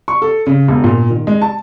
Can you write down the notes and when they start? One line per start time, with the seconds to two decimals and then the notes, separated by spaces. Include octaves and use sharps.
0.08 C#6
0.22 A4
0.47 C#3
0.68 E1
0.84 A#2
1.11 D#3
1.27 G#3
1.42 A5